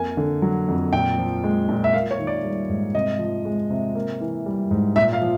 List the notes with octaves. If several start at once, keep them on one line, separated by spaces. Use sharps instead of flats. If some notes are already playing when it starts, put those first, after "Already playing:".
Already playing: F2 A#3 G#5
D3
F#3
F2
A#2 G5
F3
G#3
A#2
E5
A#3 F5
C#5
D#3
D5
G3
G#2
C3 D#5
F3
G#3
C3
A#3
E3
G3
G#2
A#2 E5
F5
F3